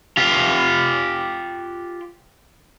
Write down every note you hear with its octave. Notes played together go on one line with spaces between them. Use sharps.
F4 G4